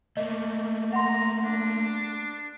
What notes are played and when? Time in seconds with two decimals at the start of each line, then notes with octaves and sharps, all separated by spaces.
0.17 A3 A#3 D#5
0.93 F#5 A#5 C6
1.44 D4